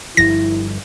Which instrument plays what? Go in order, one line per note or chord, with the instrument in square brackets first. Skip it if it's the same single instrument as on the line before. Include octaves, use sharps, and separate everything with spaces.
[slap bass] G1 G2 F3 [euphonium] E4 [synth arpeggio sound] A#6